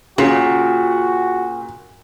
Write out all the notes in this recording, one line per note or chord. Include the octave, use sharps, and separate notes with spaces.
A#2 C#3 F#4